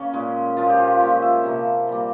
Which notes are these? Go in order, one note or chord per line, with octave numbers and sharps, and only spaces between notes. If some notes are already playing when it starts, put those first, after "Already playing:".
Already playing: C#3 A#3 C#4
A#2 G#3
A#2 F3 G#3 F4
G4
F4
A#2 G#3 C#5
E5
C3 F3 A#3
A#2 G3 A#3